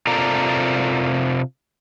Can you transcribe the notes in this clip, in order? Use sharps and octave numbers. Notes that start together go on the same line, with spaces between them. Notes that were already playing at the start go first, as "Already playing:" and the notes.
C3 F4 A4 A#4 D5 A#5